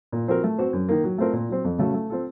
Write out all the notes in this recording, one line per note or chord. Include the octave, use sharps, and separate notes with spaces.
A#2
F3 C4 F#4 A#4
A3
C4 F#4 C5
F#2
D#3 A#3
F#3
A3 C4 F4 A#4
A#2
F#3 C4
F2
C#3 A3 C#4 F#4
A3
C4 F4 A4